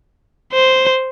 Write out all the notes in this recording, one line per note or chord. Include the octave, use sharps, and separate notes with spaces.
C5